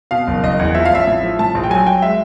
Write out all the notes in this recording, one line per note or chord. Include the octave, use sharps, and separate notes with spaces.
B2 F5
F#1
F#1 D#5
E2
F3 E5
F5
A1 E5
A2
F3
A2 A5
A#1
G5
F#3 G#5
F#3 G5
G#3 E5